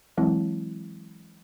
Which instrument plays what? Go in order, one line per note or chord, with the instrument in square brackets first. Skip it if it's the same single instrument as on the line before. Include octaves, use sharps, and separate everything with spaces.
[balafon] E3 F#3 G#3 C4 E4